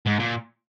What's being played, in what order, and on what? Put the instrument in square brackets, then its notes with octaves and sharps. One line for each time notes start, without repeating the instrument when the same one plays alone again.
[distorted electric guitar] G#2
A#2